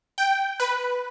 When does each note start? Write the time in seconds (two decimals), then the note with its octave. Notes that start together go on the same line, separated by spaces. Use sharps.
0.18 G5
0.60 B4